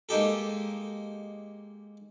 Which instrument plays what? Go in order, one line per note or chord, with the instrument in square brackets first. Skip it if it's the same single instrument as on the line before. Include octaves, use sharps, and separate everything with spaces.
[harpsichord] G#3 A#3 D#4 G4 A4